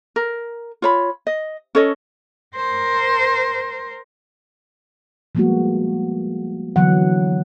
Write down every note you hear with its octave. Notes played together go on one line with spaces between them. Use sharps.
A#4
F4 C#5 B5
D#5
C#4 A4 C#5 D#5
A#4 C5
F3 G3 G#3 A#3 B3 F#4
D3 E3 F#3 B3 F#5